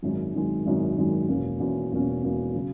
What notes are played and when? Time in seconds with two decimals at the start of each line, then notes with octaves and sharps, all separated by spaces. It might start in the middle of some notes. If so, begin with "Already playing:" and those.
0.02 G#1 F#2 D#3 G#3
0.34 G#1 F#2 D#3 G#3
0.65 G#1 F#2 D#3 G#3
0.97 G#1 F#2 D#3 G#3
1.28 E1 E2 B2 A#3 C#4
1.60 E1 E2 B2 A#3 C#4
1.92 E1 E2 B2 A#3 C#4
2.23 E1 E2 B2 A#3 C#4
2.55 C#3 F#3